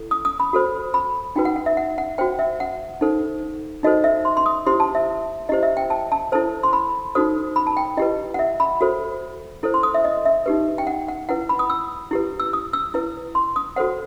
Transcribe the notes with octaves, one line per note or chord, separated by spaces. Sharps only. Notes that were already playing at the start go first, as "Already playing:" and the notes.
Already playing: E4 A4
D#6
D#6
B5
F#4 A4 C5
B5
D#4 F#4 B4 G5
F#5
F#5
E5
F#5
F#5
F#4 C5 G5
E5
F#5
D#4 A4 C5
D#4 F#4 A4 C5 D#5
E5
C6
C6
D#6
E4 G4 C5 C6
A5
E5
E4 G4 C5 D#5
E5
G5
A5
A5
E4 A4 C5 A5
C6
B5
D#4 F#4 A4 C5 D#6
B5
A5
G5
E4 G4 B4 D#5
F#5
E5
B5
F#4 A4 C5
E4 A4 C5
C6
D#6
E5
D#5
E5
D#4 G4 B4
G5
F#5
F#5
E4 B4 F#5
B5
D#6
E6
E4 G4 B4
E6
D#6
E6
E4 B4
C6
D#6
F#4 A4 C5 F#5